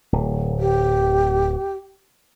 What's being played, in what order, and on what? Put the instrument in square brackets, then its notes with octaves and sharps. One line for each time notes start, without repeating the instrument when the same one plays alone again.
[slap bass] D1
[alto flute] G4